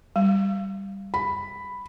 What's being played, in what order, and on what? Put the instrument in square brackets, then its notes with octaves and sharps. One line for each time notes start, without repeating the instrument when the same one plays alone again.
[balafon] G3
[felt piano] B5